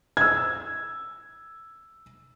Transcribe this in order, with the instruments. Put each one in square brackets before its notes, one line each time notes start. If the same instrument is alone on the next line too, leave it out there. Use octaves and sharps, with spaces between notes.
[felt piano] E6 G#6